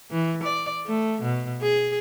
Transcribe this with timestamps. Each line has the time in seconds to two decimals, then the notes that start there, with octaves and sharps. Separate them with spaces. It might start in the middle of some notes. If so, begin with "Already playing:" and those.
0.11 E3
0.43 D5
0.86 A3
1.22 B2
1.62 G#4